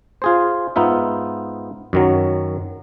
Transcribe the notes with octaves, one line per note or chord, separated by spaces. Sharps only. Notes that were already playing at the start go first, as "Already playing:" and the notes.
F4 G#4 C5
G#2 B3 D#4 F4 E5
F#2 D#3 F#3